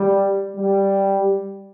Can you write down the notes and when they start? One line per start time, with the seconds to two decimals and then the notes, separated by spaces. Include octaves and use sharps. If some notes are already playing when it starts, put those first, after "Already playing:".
Already playing: G3
0.56 G3